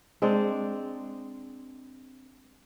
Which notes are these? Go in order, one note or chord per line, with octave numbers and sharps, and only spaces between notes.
G#3 C4 D4 D5